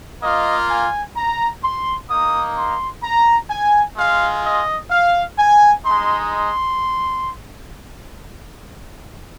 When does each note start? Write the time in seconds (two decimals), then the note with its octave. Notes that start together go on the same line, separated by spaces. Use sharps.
0.22 A#3 F4 D#5
0.69 G#5
1.16 A#5
1.63 C6
2.10 A#3 D#4 D#6
2.56 C6
3.03 A#5
3.50 G#5
3.97 G#3 F4 F5
4.44 D#5
4.91 F5
5.38 G#5
5.85 G#3 D#4 C6
6.32 C6